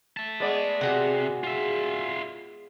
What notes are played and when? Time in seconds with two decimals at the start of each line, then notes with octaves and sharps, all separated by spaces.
0.17 E5 A5
0.40 G#3 B3 D5
0.81 C3 F#4 G#4 F#5
1.44 F4 E5